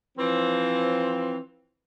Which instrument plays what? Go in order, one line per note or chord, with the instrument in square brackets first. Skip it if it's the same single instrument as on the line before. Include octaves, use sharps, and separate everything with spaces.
[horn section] E3 F3 C4